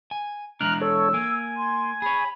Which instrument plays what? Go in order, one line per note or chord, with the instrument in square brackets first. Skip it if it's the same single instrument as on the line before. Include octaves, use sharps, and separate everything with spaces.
[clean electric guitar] G#5
[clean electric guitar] E3 G#3 D4 [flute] A#5 [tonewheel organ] F6 F#6
[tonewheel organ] A4 C#5 [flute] E6
[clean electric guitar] A#3 [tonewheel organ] G#5
[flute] C6
[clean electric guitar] G#4 C#5 [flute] B5